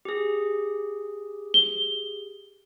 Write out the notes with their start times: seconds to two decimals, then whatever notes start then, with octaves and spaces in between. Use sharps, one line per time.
0.05 G4 G#4
1.54 G7